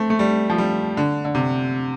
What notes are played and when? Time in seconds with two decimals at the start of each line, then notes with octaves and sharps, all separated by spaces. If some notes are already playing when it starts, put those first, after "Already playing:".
Already playing: A3 C4
0.10 A3
0.19 G3
0.50 F3
0.58 G3
0.97 D3
1.25 D3
1.35 C3